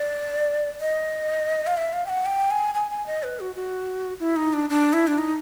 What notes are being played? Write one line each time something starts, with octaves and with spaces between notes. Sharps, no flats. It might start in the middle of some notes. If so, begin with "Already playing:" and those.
Already playing: D5
D#5
F5
E5
F5
G5
F#5
G5
G#5
G#5
G#5
D#5
B4
F#4
F#4
E4
D#4
D4
D4
E4
D4
D#4